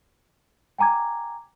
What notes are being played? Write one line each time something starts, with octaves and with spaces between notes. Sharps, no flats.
G5 G#5 A#5 D6 G#6